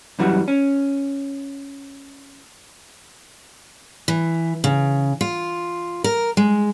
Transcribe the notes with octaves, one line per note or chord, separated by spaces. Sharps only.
F#2 E3 G3 F#4
C#4
E3
C#3
F4
A#4
G#3